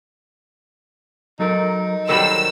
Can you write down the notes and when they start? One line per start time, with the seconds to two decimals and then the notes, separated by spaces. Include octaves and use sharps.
1.40 F#3 D#4 A4 A#4
2.09 D#3 F#3 G3 A4 C5 B5 E6